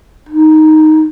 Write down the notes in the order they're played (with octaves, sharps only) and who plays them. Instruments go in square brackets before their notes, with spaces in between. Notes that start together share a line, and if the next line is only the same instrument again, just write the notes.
[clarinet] D#4